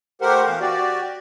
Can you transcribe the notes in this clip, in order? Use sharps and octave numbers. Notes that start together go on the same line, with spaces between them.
A3 G4 A#4 C5 F#5
B2 E3 F5
F#4 G4 D5